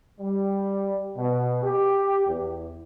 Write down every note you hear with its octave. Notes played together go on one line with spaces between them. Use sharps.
G3
B2
G4
E2